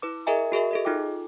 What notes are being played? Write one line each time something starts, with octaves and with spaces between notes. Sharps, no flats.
E4 B4 D6
G#4 A#4 D#5 E5 G#5 A#5
F#4 G#4 A#4 E5
G#4 A4 D#5
D#4 F4 A4 G5 D6